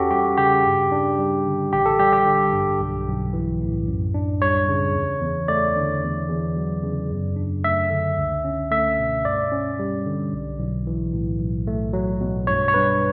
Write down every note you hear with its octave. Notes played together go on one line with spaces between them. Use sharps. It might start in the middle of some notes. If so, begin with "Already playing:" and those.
Already playing: E2 C#4 F#4 G4 A4
G3 G4
C#3 G4
G2
D4
G3
D3
A1 G4
A4
G3 G4
G4
D3
G2
B1
B1
E3
A2
F#2
D4
G3 C#5
C#3
E2
E2
A3 D5
D3
E2
E2
F#3
C#3
F#2
D4
A3 E5
D3
C#2
C#4
A3 E5
B2
G2 D5
C#4
G3
D3
B1
B1
E3
A2
B1
A3
F#3
B2
G2 C#5
C#5
G2 B4